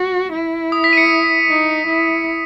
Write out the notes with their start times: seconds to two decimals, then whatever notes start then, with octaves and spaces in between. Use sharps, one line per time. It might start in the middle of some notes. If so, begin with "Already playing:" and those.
Already playing: F#4
0.33 E4
0.72 D#6
0.84 B6
0.93 D#7
0.97 C#7
1.50 D#4
1.87 E4